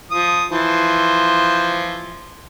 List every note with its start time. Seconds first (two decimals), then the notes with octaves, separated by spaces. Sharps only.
0.11 F3 D#6
0.51 E3 F3 C5